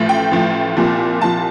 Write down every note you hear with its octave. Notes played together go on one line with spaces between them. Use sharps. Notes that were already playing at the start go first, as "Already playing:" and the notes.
Already playing: A1 A2 F3
G5
A1 A2 F3
C2 A#2 F3
C2 A#2 F3 A5